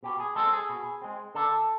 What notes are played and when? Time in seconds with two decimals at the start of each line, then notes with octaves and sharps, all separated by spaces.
0.03 B2 G4
0.20 G#4
0.35 G#3 C4 A4
0.53 G#4
0.69 B2
1.02 G#3 C4
1.35 D3 A4